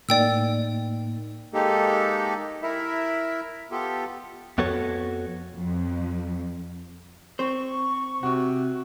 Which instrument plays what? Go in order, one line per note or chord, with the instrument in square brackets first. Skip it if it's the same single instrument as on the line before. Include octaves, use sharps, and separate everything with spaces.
[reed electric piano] A2 A#3 D#4 [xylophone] D5 G5 E6
[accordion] G#3 A#3 D#4 G4 A4
E4 A#4 E5
B3 F4 G4 A4
[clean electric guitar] F2 B3 F#4 A4 C#5
[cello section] F2
[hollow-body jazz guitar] C4 C5 [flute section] C#6
[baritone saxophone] C3 [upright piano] F#4